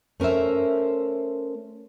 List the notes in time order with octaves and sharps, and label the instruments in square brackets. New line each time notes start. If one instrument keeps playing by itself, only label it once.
[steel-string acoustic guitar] A3 C#4 A#4 C5 E5